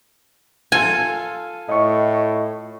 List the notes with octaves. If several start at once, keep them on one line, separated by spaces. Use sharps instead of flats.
F4 A4 G#5
A2 D#5 C#6